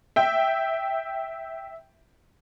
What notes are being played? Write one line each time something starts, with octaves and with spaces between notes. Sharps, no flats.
E5 G5